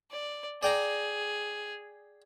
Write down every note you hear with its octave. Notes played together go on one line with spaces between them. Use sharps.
D5
G#4 D5 G5 A#5